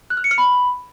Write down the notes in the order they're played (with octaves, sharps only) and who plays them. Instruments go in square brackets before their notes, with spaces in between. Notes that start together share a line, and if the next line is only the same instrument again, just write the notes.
[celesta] F#6
F6
C#7
F6
B5